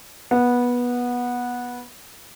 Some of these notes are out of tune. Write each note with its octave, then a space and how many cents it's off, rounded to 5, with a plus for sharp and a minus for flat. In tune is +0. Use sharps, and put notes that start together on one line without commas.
B3 -15